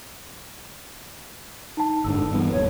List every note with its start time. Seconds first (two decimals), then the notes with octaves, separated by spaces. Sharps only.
1.77 D#4 A5
2.04 F#1 G#2 D3 E6
2.31 G2 E3 B3
2.52 D1 F#2 A#2 C#5